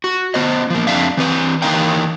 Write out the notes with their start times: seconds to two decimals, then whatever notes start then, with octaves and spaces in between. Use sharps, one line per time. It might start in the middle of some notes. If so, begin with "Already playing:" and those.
0.04 F#4
0.34 B3 C5 D#5
0.70 F3 A#3
0.87 F2 C4 D4 E5 F5
1.17 E3 C4 B4
1.62 E3 A#3 D#4 A#4 F5 G5